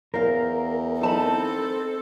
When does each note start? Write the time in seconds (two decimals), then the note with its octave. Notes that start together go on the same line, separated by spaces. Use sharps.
0.14 E2 A#4 C5 F5
1.01 C4 D#4 A4 A5 B5